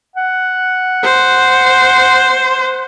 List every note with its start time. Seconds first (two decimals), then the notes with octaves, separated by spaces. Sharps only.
0.16 F#5
1.04 C5